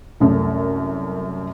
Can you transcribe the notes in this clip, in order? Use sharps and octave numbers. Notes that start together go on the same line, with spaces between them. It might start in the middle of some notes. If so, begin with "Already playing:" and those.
C2 F#2 A3